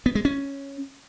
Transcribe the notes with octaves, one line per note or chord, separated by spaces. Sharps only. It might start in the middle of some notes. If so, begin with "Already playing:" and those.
B3
G#3
C#4